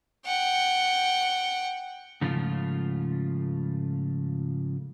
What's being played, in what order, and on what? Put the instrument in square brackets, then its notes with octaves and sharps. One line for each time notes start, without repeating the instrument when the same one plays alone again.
[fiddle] F#5 G5
[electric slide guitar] G#2 C#3 F3 A3 F4